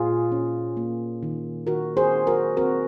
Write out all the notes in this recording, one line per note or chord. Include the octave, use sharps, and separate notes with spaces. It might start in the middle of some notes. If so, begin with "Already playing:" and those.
Already playing: A#2 F4 G#4
C#4
A#3
D#3
D#3 F#4 A#4
G#4 C5
D#4
F#4 A#4
C4 F#4 A#4